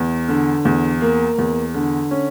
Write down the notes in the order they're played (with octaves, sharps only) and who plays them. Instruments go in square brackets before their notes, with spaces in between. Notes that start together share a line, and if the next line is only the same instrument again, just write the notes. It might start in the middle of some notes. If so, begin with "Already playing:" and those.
Already playing: [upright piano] E2
D3
E2
A#3
E2
D3
C#4